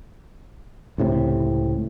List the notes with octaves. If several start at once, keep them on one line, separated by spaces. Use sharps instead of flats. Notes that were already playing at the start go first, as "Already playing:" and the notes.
C#2 A2 C3